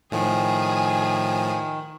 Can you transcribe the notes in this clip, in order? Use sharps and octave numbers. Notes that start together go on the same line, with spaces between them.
A2 D#3 F3 G#4 G#5